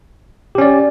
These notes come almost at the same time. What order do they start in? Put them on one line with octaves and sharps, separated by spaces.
G4 C#4 D5